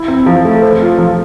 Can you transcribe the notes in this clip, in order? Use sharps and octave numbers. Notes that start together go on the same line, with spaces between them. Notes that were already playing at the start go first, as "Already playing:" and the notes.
Already playing: E4
C4
F3
A3
C5
F4
F3